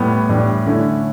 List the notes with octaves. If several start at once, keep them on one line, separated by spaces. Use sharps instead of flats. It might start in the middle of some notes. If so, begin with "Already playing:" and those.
Already playing: A2 G3 B3
A2 E3 G3 D4
D3 A3 C#4 E4